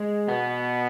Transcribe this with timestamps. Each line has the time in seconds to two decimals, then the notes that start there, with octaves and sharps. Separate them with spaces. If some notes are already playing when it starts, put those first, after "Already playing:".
Already playing: G#3
0.28 B2 B3